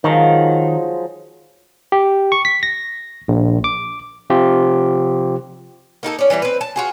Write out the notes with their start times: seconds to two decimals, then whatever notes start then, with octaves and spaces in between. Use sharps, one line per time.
0.04 D#3 F3 F#3 G#3
1.92 G4
2.32 C#6
2.45 B6
2.63 A#6
3.28 A#1
3.64 D6
4.30 C3 F3 F4 G4
6.03 A#3 D#4 F#4 A4
6.19 C#4 D5
6.30 E3 G3 D#4 E4
6.42 C4 B4
6.61 A5
6.76 F4 F#4 G#4